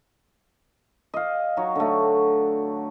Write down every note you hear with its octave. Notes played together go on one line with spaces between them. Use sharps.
D#5 F5
F#3 D#4 F#4 C#5
D3 A3